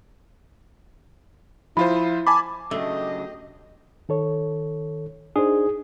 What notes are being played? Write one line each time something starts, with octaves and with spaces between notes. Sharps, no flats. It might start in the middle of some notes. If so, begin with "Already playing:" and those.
F3 E4 F4 C5 B5
G#5 A5 B5 D6
C#3 F#3 A3 D4 G4 D#5
D#3 A4 C#5
D4 D#4 G#4 C5